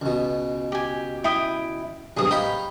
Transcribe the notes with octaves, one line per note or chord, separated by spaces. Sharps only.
C#2 B2
G4 G#5
E4 G5 D#6
B1 G2 C3 G#4 D#6
D#4 C#5 F5 G5 B5